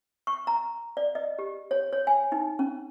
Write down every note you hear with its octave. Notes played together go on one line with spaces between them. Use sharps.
C#6
A#5
D5
D#5
G4
C#5
C#5
G#5
D#4
C#4